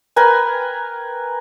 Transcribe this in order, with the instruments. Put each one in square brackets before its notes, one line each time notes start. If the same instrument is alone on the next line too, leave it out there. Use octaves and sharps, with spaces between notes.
[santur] A#4 B4 G5 G#5